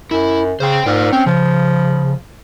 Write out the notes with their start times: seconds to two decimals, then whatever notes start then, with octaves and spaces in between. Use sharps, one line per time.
0.11 F#2 E4
0.60 C#3 C5 G5
0.86 G#2 F4 A#4 D5
1.13 C4 C#4
1.26 C#3 F3